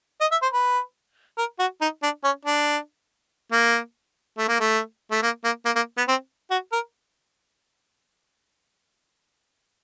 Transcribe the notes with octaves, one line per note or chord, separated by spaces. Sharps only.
D#5
E5
C5
B4
A#4
F#4
D#4
D4
C#4
D4
A#3
A3
A#3
A3
A3
A#3
A#3
A#3
A#3
B3
C4
F#4
A#4